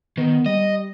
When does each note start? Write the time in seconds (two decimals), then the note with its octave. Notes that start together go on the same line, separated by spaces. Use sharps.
0.17 D#3 B3
0.46 G3 D#5